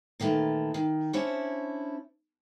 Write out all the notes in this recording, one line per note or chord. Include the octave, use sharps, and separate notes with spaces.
A#2 D#3 E3 A3
D#3
C#4 D4 E4 C5 C#5